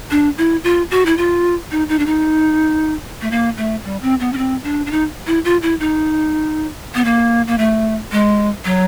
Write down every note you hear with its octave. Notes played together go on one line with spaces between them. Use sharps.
D4
E4
F4
F#4
E4
F4
D#4
D#4
D4
D#4
A3
A#3
A3
G3
C4
B3
C#4
C4
D4
D4
D#4
E4
F4
E4
D#4
B3
A#3
A#3
A3
G#3
F#3